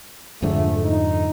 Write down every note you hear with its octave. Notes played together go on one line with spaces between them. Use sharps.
F2 G#2 D3 A3
D#4